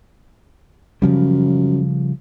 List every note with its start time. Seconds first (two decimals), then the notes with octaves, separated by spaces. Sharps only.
1.02 F#2 C#3 F3 G3